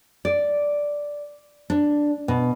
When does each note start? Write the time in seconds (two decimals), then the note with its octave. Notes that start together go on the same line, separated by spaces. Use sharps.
0.25 D5
1.70 D4
2.28 B2